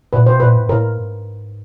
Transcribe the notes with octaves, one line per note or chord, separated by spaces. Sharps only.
A#2 B4
B2 C5
A#2 B4
A2
A2 A#4
G#2